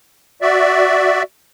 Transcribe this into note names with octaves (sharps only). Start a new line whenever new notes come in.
F#4 D5 E5